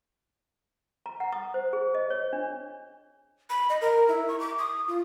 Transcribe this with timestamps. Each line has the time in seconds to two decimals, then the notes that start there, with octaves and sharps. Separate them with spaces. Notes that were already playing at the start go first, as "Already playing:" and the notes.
1.06 A#5
1.20 F#5
1.32 D#6
1.54 C5
1.73 G#4
1.95 D#5
2.10 C#5
2.33 D4
3.50 B5
3.69 D#5
3.81 A#4
4.08 E4
4.28 C#6
4.40 D6
4.59 D#6
4.88 F4